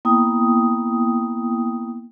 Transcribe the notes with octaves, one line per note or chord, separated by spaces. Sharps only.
A#3 B3 E4 G5 D#6